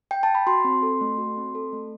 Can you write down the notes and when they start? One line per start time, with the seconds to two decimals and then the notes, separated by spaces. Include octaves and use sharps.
0.11 G5
0.23 A5
0.35 B5
0.47 F#4 C6
0.64 C4
0.82 A4
1.01 A3
1.18 F#4
1.37 C4
1.55 A4
1.73 A3